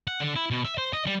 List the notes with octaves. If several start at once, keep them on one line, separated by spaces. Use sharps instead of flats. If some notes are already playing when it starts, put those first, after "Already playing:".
F#5
D3
E4
B2
E5
C5
D#5
G3